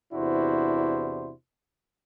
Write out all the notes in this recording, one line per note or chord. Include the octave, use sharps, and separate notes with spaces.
E2 C3 D4 E4 F#4 C5